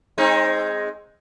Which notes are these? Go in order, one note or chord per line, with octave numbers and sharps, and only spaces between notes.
G#3 C4 D#4